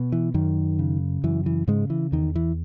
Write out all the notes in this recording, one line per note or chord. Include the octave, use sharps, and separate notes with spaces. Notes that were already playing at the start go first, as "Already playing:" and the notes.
Already playing: B2
E3
F#2 D#3
C#3
F#2 E3
E3
G#2 C#3 G#3
E3
E2 D#3
E3